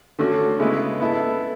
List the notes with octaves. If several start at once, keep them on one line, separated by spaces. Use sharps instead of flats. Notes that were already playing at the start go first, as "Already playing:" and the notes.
D3 A3 C#4 F#4
C#3 G#3 B3 E4 B4
B3 E4 A4